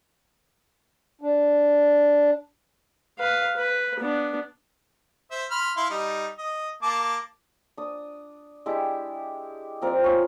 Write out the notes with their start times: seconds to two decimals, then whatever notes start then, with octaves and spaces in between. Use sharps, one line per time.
1.21 D4
3.19 B4 F5
3.57 B4
4.00 B3 D4
5.31 C5 E5
5.51 B5 C6 F6
5.77 E4 F5 C6
5.90 G3 D#4
6.38 D#5
6.83 A#3 A5 D6
7.77 D4 D#6
8.66 G#3 D4 E4 G4
9.82 F3 C4 A#4 D5
10.04 C#4 F4 C6 E6